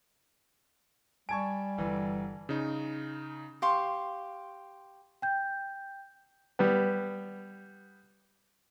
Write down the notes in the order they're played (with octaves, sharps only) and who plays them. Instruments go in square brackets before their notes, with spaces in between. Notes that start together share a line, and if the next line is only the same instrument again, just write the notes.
[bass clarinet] G3 [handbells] G#5 A5 [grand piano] C#6 G#6 D7
[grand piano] G1 E3
[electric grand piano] C#3 D#4
[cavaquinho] G4 F5 C6 C#6
[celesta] G5 G6
[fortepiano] G3 B3